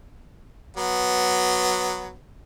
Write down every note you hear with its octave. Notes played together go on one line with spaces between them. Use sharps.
F#3 B3